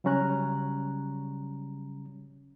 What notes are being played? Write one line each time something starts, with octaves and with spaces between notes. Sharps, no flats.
C#3 F#3 G3 C#4 A#5 F#6